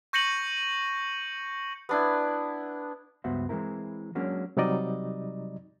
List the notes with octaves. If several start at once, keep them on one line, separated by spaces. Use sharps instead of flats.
C#6 G6 A#6 C#7 D#7 F#7
B3 D4 E4
C#2 G2 B3 F#4 C5 E5
E3 G#3 A3 C4 E4 A#4
F#3 G#3 A#3 C#4 D4 F#4
C3 F#3 G3 D#4 D5 D#5